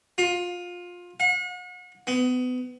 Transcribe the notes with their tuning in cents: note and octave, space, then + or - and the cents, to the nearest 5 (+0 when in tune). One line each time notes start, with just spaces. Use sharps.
F4 +20
F#5 -40
B3 +30